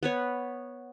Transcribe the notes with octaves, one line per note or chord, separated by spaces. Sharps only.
B3 B4 C#5